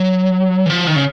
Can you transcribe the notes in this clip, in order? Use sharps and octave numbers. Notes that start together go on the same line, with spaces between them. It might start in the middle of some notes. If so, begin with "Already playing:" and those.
Already playing: F#3
E3
F3
D#3
C#3